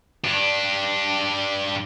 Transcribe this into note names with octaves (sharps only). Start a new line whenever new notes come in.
G2 D4